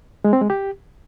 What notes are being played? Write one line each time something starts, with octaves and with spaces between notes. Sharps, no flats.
G#3
C4
G#3
G4